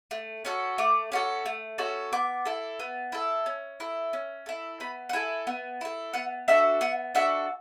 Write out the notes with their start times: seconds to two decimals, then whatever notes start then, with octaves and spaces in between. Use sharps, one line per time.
0.11 A3
0.45 C#4 F#4 A4
0.78 A3 D6
1.12 C#4 F#4 A4
1.46 A3
1.78 C#4 F#4 A4
2.13 B3 D6
2.45 E4 A4
2.80 B3
3.12 E4 A4
3.46 C#4
3.80 E4 A4
4.13 C#4
4.46 E4 A4
4.80 B3 B5
5.09 F#5
5.13 E4 A4 G#5
5.47 B3
5.81 E4 A4
6.13 B3 F#5
6.48 D4 F#4 A4 E5
6.81 B3 F#5
7.15 D4 F#4 A4 E5